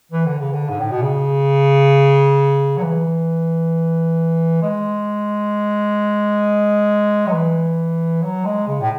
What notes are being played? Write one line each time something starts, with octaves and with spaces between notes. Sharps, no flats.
E3
D3
C#3
D3
G#2
A2
B2
C#3
F#3
E3
G#3
F#3
E3
F#3
G#3
C#3
A2